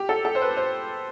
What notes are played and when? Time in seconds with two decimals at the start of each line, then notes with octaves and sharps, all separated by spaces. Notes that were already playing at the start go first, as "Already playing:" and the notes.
Already playing: G4
0.09 A4
0.25 A4
0.35 C5
0.42 B4
0.57 C5